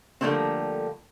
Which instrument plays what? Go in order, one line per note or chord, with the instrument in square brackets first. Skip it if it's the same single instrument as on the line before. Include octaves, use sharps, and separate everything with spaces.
[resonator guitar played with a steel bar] D3 F3 G3 A3 A#3 C4